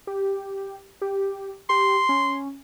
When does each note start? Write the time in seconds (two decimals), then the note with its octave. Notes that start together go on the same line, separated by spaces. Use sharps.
0.07 G4
1.02 G4
1.70 G4 C6
2.09 C#4